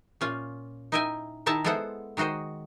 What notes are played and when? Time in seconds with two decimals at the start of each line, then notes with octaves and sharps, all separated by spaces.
0.21 A#2 C#4 F4
0.92 D#4 E4 D#5 E5 G5 G#5
1.46 D#3 D#4 E4 E5 A5 A#5
1.64 G#3 B3 E4 A4 C5 F#5
2.17 D#3 G#3 F#4 C5 D#5